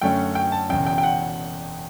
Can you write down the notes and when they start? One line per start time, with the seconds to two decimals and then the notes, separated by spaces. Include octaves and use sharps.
0.01 F#2 D3 A3 C#4 G5
0.35 G5
0.52 A5
0.69 E1 E2 C#3 G5
0.86 G5
0.98 G5
1.03 F#5